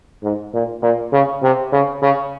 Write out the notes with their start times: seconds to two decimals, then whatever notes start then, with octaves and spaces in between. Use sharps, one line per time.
0.23 G#2
0.54 A#2
0.83 A#2
1.13 C#3
1.43 C3
1.73 C#3
2.02 C#3